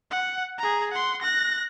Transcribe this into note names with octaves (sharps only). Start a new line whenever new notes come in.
F#5
G#4 A#5
F#5 C6
F#6 A#6